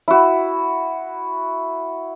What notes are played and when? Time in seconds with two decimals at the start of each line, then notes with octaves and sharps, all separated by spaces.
0.08 E4 F#4